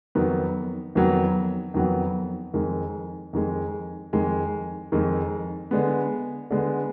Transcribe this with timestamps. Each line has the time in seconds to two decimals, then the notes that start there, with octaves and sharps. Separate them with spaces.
0.15 F2 D#3 F#3 B3
0.95 F2 D#3 F#3 B3
1.74 F2 D#3 F#3 B3
2.54 F2 D#3 G#3
3.33 F2 D#3 G#3
4.13 F2 D#3 G#3
4.92 F2 D#3 G#3
5.71 D3 G#3 B3
6.50 D3 G#3 B3